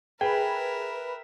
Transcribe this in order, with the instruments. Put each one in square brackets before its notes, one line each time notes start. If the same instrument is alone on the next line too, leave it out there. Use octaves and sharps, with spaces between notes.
[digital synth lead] G#4 [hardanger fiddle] A#4 E5 [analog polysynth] B4 [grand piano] G5